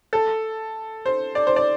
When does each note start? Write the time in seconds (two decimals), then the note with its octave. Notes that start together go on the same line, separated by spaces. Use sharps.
0.13 A4
1.06 C5
1.35 D5
1.47 C5
1.56 D5